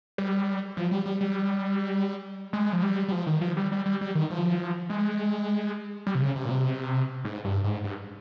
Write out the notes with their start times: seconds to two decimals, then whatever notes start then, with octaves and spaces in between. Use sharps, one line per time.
0.18 G3
0.77 F3
0.91 G3
1.06 G3
1.21 G3
2.53 G#3
2.73 F3
2.83 G3
3.08 G3
3.12 F3
3.27 D#3
3.41 F3
3.57 G3
3.72 G3
3.86 G3
4.01 G3
4.15 D#3
4.30 F3
4.90 G#3
6.07 G3
6.15 C3
6.22 C#3
6.36 C3
6.45 A#2
6.51 C3
7.25 G#2
7.45 G2
7.64 G#2
7.84 G2